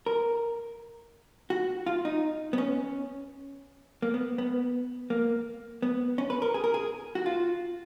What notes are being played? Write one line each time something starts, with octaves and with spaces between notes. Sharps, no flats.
A#4
F#4
F4
D#4
B3
C#4
A#3
B3
B3
A#3
B3
C#4
B4
A#4
G#4
A#4
G#4
F#4
F4